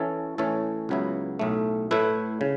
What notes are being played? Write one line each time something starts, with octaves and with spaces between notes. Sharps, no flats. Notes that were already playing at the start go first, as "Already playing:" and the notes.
Already playing: E3 C#4 A4 C#5
A2 E3 C#4 A4 C#5
C#2 C#3 F#3 B3 E4
B1 A2 A3
A2 A3 E4 B4
C#3